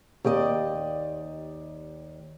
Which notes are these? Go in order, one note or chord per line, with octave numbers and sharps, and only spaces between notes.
D#2 G4 D5 D#5